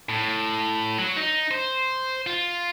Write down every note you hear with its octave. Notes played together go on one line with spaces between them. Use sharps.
A2
F#3
D#4
C5
F4